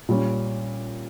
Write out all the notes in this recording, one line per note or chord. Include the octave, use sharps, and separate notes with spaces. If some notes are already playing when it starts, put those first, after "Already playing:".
A#2 G3 C#4